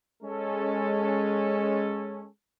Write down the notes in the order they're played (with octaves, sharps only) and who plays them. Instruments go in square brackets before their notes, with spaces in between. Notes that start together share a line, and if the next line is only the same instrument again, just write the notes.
[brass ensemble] G#3 C#4 A4